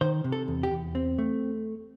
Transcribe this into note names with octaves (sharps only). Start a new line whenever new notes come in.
D#3 C5
C3
A4
E2
G4
E2
C4
A3